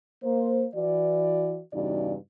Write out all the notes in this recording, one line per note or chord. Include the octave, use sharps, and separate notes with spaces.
A#3 C5
E3 F#4 D5
E2 G2 C#3 D#4 F#4 D5